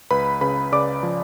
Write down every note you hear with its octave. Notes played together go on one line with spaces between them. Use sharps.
C#2 B4 B5
C#3 B4 B5
C#3 D5 D6
F3